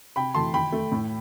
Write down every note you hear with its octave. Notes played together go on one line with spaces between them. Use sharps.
C3 G5 B5
E3 A3 A5 C6
D#3 G5 B5
A3
A2